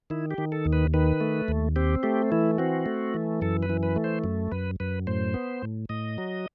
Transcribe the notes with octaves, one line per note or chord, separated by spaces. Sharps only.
D#3 E4
G4
D#3
A4
D#2
B4
D#3 B4
A3
D#2
C4 G4
A3 G4
E3 E4
C4 F#4
A3
E3
F#2 A4
B4
E3
B4
A3
C5
F#2
F#2 B4
F#2 B4
A2 C5
B3
A2
A2 D#5
F#3